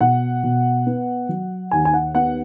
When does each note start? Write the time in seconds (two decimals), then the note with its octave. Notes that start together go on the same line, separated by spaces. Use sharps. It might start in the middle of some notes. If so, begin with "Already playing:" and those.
0.01 B2 F#5
0.43 B2
0.87 B3
1.29 F#3
1.71 D#2 G#5
1.85 G#5
1.93 F#5
2.15 B3 F#5